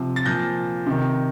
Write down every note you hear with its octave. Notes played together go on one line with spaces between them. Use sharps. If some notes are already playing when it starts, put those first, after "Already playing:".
Already playing: C3 F3
A6
A#2 F3 G6 A#6
C3 D#3